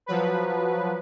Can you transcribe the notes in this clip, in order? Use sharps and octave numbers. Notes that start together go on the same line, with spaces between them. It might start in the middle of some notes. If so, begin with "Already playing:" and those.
F3 F#3 B4